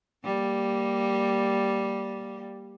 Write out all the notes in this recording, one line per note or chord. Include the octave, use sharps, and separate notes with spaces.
G3 A#3